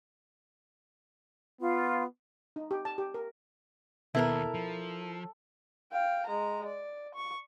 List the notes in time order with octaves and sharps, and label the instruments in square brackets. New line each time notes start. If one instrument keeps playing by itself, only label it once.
[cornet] B3 [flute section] F4
[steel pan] D#4
G4
A5
G4
A#4
[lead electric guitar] D#2 [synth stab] B2 B3 [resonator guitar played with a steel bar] E4 A#4 [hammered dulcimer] A4
[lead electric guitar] F3
[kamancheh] F5 G5
G#3 A#5
D5
C#6